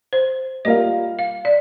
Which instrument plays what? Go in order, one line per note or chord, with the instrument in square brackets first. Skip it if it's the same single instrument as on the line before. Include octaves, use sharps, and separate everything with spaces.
[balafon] C5
[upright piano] G3 A#3 F4 A#4 F5 [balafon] D#5
[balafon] F5
D5